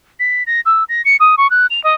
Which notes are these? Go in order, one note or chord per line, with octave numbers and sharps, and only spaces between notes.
B6
A#6
E6
A#6
C#7
D#6
C#6
F#6
F7
D#5